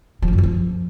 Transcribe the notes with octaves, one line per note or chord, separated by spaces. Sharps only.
F3
F2
F#2
F#3
F3